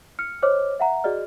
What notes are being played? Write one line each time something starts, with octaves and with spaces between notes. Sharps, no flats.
F6 C#7
C5 C#5 D#5 D6 F6
E5 F#5 A#5
F#4 G#4 D5 D#5 F6